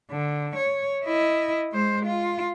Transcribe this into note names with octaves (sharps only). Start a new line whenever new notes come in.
D3
C#5
E4 D#5
G#3 C5
F4